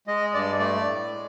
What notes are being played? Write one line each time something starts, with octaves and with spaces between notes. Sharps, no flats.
G#3 D#5
G2 D5
A3 D5
A2
G#3